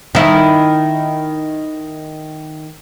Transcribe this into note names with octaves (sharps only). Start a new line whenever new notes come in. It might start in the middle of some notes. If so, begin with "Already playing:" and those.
D#3 E4